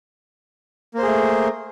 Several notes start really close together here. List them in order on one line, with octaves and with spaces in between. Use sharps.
A#3 C5 G#4 A3